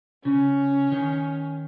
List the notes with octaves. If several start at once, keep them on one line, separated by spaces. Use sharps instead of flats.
C#3 C#4
D#3